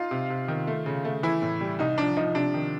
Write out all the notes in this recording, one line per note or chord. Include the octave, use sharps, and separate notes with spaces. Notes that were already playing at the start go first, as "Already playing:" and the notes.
Already playing: D#4 F4
C3
C3
D#3
A3
C#3
A3
E3 E4
A2
G3
C2 D#4
F3 D4
F3 D#4
C3 D4
D#3